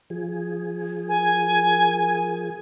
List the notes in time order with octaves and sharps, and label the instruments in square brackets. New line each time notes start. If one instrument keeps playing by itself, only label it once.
[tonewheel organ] F3 G#4
[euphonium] A#4 [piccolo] G#5